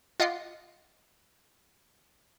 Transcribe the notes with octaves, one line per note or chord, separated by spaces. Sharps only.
F4 D#5 F#5 C6 D6